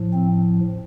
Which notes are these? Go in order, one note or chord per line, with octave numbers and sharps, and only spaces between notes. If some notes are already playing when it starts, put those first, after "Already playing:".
Already playing: A2 F3
C4